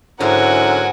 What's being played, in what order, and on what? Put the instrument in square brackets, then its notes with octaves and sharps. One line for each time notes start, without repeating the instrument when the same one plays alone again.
[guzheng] G#2 [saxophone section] D3 C#4 E4 [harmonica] F#3 A#4 [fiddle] F#5 G#5